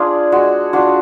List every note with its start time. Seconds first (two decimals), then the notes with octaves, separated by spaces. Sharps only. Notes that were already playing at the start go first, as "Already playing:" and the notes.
Already playing: D4 F4 G#4
0.32 G#3 F#4
0.73 D4 F4 F#4